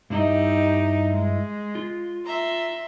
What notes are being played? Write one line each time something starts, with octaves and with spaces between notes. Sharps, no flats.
G2 D#4 E4 G4 D#5
G#3
F4
E5 A#5 C6